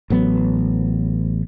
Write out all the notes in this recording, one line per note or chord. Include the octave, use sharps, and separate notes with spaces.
A1 F#3 B3